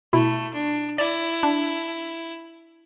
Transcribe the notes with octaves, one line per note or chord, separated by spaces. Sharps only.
B2 A3 E4
D4
E4 D5
D4